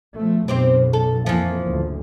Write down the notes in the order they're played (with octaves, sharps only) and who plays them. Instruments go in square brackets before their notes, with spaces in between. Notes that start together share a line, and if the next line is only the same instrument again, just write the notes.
[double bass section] B2 F3 A3
[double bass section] B1 F#2 B2 [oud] C4 G4 C5
[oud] A4
[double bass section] F2 A#2 A#3 [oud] E3 F3
[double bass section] F#1 D2 G#2